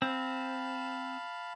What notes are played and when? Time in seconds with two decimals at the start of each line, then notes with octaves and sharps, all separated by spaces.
0.02 C4 F5 A5 B5